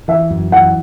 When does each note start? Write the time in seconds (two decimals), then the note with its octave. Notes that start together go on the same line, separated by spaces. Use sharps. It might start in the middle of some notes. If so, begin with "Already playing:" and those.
0.08 E3 E5
0.30 F#2
0.52 E3 F#5